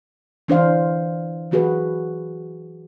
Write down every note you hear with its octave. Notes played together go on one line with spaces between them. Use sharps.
E3 D4 C5 F5
E3 F#3 F#4 G#4 B4